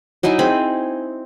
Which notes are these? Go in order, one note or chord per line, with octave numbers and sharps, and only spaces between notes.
F#3 D#4 E4 G#5
C4 G#4 B5